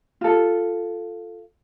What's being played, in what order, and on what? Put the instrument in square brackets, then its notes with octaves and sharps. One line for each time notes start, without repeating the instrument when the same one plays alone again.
[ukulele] F4 A4